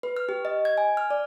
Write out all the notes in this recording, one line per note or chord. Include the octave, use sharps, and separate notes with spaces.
B4
F6
G4
D#5
G#6
G#5
F6
D5